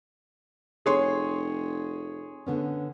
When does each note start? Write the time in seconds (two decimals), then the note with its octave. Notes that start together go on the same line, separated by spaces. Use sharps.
0.86 F1 G#4 C#5 C6
2.47 D3 B3 C#4